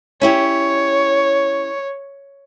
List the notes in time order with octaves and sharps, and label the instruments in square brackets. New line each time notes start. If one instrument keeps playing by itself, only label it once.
[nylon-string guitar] C#4 E4 G4 [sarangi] C#5